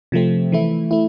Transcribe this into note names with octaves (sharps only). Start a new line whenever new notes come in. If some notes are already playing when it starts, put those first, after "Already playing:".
C3 F3 A3 C4
E3 A3 E4
A3 E4